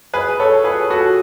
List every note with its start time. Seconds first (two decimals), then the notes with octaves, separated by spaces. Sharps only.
0.13 G#4 B4
0.40 A4 C#5
0.64 G#4 B4
0.90 F#4 A4